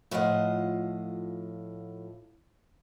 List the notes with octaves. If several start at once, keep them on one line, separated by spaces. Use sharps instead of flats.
A2 F3 F4 D#5 F#5